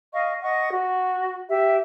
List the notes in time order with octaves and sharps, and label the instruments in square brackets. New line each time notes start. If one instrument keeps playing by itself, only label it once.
[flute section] D#5 F5 C#6
D#5 F#5 C#6
F#4
G4 E5